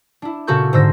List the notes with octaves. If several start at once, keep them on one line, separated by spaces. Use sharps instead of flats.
D4 E4
A#2 C#3 F#4 A4 C#6 G6
G#2 D3 C5 E6 A#6